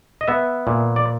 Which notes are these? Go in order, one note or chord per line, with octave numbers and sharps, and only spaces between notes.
D#5
B3 E5
A#2
D5